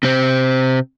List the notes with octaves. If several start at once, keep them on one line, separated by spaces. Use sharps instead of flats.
C3 C4